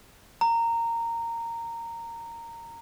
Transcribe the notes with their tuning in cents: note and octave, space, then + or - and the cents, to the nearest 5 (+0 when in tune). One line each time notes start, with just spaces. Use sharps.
A#5 -15